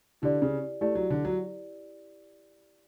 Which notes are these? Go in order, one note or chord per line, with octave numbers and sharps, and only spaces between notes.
D3 E4 G4 D5
C#3
A3 E4 G4 D5
F#3
D3
F#3